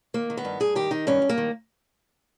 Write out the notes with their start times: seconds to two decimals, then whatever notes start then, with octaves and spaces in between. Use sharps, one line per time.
0.14 D#3 A#3
0.30 D#3
0.37 B3
0.45 G2
0.60 G2 G#4
0.75 D#3 G4
0.91 D#3 D#4
1.07 G2 C#4
1.22 G2
1.29 A#3
1.38 D#3